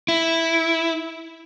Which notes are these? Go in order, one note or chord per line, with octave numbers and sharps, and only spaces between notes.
E4